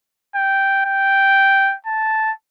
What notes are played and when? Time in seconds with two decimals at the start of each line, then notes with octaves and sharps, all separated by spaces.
0.36 G5
0.85 G5
1.86 A5